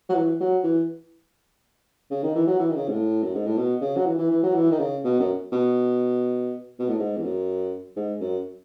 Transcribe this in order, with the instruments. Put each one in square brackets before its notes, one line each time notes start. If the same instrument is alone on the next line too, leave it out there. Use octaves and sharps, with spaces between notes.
[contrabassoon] F#3
E3
F#3
E3
C#3
D#3
E3
F#3
E3
D#3
C#3
G#2
A2
F#2
G#2
A2
B2
C#3
F#3
E3
E3
E3
F#3
E3
D#3
C#3
B2
F#2
B2
B2
A2
G#2
E2
F#2
G#2
F#2